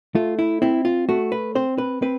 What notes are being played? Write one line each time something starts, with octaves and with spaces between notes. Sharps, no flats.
A3 F4
E4
C4 E4
F4
A3 F#4
B4
C4 C5
B4
C4 B4